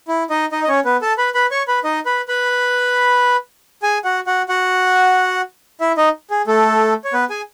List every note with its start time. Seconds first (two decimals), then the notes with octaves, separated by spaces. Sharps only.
0.08 E4
0.30 D#4 D#5
0.52 D#4 D#5
0.64 D#5
0.69 C#4 C#5
0.85 B3 B4
1.02 A4 A5
1.18 B4 B5
1.34 B4 B5
1.51 C#5 C#6
1.68 B4 B5
1.84 D#4 D#5
2.06 B4 B5
2.28 B4 B5
3.83 G#4 G#5
4.04 F#4 F#5
4.27 F#4 F#5
4.49 F#4 F#5
5.81 E4 E5
5.97 D#4 D#5
6.30 G#4
6.47 A3 A4
7.04 C#5
7.13 B3 B4
7.30 G#4 G#5